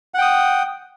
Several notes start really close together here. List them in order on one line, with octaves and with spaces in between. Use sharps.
F#5 G5 D#6